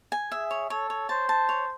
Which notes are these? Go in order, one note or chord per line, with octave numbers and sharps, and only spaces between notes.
G#5
G#4 E5
C#5
A4 C#5
C#5
C5 A5
A5
C#5